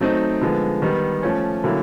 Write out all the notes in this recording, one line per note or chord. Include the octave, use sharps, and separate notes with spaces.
F#3 A3 C4 D#4
D3 F3 G#3 B3
D#3 G3 B3
F3 A3 C#4
D3 F#3 A#3 C#4 E4